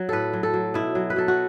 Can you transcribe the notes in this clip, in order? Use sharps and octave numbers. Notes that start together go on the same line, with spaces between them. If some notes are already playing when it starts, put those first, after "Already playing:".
Already playing: F#3
A2 A4 B4
F#3
A4
F#3
B2 E4
F#3
B4
F#3 A4
F#4